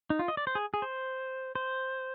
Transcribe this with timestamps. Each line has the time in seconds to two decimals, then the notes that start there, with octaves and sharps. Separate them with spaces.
0.10 D#4
0.19 F4
0.28 D#5
0.37 D5
0.47 C5
0.55 G#4
0.74 G#4
0.82 C5
1.55 C5